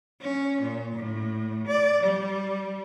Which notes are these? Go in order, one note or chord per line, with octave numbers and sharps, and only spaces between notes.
C#4
A#2
A2
D5
G3